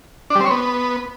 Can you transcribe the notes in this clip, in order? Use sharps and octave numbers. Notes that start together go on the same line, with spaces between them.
D4
G3
C4
C#5
B3